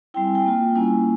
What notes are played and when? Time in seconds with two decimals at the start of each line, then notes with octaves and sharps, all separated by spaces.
0.14 G3 C4 E4 G5
0.24 G#5
0.35 G5
0.45 A#3 F4
0.75 G3 A#3 C#4 E4 G#5